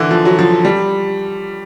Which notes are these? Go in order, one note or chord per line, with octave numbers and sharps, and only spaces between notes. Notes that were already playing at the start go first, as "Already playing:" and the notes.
Already playing: D3 E3
F3
F#3
F3
G3